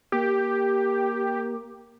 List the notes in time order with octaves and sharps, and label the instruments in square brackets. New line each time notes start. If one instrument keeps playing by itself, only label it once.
[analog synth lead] A#3 [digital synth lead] G4